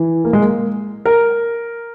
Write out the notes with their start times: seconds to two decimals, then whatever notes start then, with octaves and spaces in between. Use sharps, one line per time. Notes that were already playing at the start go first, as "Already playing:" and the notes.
Already playing: E3
0.25 A#3
0.33 G#3
0.41 A#3
1.05 A#4